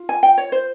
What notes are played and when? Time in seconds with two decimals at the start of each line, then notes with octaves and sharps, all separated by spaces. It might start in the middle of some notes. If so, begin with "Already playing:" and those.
Already playing: F4
0.09 G#5
0.23 G5
0.38 C#5
0.52 C5